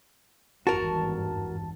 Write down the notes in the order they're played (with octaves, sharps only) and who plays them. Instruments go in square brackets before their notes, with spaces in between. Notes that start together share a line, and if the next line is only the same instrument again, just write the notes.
[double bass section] G#1 E2 G2 [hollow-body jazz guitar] F#4 A#4 [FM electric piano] A5